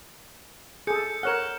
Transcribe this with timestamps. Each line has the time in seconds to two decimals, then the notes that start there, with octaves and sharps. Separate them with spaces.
0.87 G#4 A4 G6 C#7
1.23 A#4 C#5 F#5 F6 E7